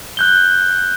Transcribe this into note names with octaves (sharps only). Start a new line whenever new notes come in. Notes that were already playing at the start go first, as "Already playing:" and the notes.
F#6 G6 G7